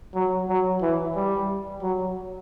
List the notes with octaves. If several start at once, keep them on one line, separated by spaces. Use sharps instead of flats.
F#3
F#3
E3
G3
F#3